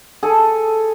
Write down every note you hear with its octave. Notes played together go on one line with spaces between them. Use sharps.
G#4 A4